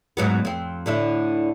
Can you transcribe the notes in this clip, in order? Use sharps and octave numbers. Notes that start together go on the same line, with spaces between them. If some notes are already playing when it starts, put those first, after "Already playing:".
G#2 F#3 B3
F2 C4
A2 D3 E4